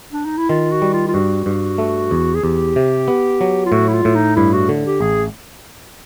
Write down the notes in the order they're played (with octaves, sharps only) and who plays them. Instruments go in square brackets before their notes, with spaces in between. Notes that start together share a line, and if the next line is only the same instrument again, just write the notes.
[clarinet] D4
D#4
E4
[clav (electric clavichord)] D#3 [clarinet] F4
[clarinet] F#4
[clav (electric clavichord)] G3
[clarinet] F4
F4
[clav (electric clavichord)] G2 [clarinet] F#4
[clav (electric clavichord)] G2
A3
E2
[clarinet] G#4
[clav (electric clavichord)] E2 [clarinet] G4
[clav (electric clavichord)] C3
B3
F#3
[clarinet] F4
[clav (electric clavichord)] A2 [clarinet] F#4
[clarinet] E4
F4
[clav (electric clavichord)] A2
[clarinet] D#4
[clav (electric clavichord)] G2 [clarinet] E4
[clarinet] F#4
[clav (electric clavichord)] D3
[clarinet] G4
[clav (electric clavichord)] A1 [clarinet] G#4